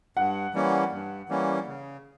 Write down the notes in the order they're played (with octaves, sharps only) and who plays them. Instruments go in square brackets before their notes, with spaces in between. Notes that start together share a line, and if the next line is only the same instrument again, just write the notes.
[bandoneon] G2 [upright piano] F#5
[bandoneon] E3 G3 A#3 C#4
G2
E3 G3 A#3 C#4
C#3